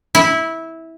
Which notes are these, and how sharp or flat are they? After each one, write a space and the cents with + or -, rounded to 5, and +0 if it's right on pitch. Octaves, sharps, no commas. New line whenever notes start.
E4 -15